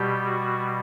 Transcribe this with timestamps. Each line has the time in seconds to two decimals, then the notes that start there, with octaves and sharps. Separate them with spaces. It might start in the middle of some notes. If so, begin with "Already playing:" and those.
Already playing: B2 G3 G4
0.25 F#4